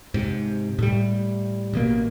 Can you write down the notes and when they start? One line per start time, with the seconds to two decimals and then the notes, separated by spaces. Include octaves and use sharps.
0.14 G#2 C3
0.79 A2 G3
1.74 A1 B2 A#3